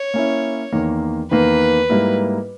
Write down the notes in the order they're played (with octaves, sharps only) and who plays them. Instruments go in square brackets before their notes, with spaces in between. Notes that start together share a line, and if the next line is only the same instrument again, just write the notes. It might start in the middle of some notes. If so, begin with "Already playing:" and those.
Already playing: [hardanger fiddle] C#5
[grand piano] A#3 C#4 E4
E2 D#3 A#3
[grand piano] E2 D#3 A#3 [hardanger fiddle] B4
[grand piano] G#2 G3 A#3 E4